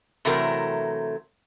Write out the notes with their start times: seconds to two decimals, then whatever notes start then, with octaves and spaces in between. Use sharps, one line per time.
0.25 C3 E3 F#3 A3 C4 A#4